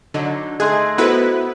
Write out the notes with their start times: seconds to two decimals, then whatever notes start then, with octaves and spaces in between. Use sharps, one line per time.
0.14 D3 F#3 D#4
0.60 A3 D#4 G#4 C6 F#6 G#6
0.98 B3 E4 F#4 A4 B4 C5